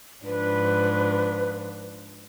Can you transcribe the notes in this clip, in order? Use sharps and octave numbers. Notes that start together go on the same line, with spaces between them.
G#2 F3 D4 B4